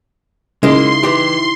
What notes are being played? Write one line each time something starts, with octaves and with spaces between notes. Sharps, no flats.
C#3 G#3 A#3 D#4 E4 E5 C6
E3 G4